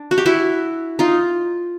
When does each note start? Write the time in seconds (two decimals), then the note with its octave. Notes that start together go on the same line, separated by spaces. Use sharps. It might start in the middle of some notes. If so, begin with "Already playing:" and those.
Already playing: D4
0.11 F#4
0.18 G4
0.26 E4 F#4
0.99 D#4 F4